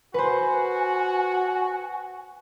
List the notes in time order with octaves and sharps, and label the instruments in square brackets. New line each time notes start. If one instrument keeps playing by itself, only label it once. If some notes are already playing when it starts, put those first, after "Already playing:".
[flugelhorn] F#4 [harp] B4 C5 [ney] G#5